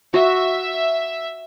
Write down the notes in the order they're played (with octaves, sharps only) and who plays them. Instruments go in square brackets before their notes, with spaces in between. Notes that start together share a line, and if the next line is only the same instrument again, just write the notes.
[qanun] F#4 [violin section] E5